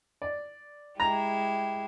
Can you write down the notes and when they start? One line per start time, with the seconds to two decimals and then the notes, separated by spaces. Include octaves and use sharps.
0.22 D5
1.00 G#3 E4 G4 A#5